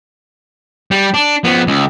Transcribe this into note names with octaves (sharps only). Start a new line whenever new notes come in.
G3
D4
F3 B3
C#2